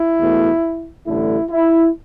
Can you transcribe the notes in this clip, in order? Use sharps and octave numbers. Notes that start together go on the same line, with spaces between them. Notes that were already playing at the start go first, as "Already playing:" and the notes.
Already playing: E4
E2 B2 A3
A1 G2 D3 A3 E4
E4